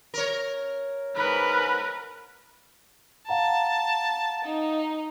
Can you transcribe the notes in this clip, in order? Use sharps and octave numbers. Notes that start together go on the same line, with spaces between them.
A#4 C#5
G#2 A#4 B4 B5
F5 F#5 A5 A#5
D#4